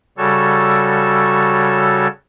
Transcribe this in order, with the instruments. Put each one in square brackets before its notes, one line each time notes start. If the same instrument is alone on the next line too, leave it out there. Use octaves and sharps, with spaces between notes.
[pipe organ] C#3 G3 F#4 A4 C#5 E6